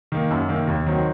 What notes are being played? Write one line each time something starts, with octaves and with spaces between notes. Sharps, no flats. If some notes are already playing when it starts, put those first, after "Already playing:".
D#3 A#3
F#2
D#3 A#3
D#2
D#3 F#3 C4 F#4